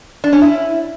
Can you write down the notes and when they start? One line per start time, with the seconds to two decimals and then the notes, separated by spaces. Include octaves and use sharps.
0.24 D4
0.33 C#4
0.42 E4